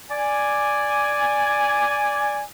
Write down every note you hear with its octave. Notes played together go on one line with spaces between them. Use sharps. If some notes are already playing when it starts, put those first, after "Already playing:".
D5 G#5